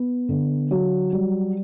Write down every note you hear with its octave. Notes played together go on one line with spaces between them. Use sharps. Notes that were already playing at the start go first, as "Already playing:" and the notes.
Already playing: B3
D3
F#3
G3